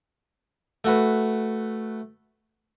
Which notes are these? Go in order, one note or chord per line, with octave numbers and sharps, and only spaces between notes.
A3 F#4 B4